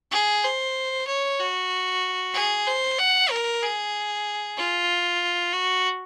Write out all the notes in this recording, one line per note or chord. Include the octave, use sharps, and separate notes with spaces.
G#4
C5
C#5
F#4
G#4
C5
F#5
A#4
G#4
F4
F#4